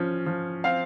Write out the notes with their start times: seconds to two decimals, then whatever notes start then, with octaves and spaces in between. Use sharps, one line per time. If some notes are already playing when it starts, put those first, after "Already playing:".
Already playing: F3 C#4
0.26 F3
0.64 C4 F5